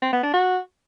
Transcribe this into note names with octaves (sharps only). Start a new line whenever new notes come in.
C4
B3
D4
F#4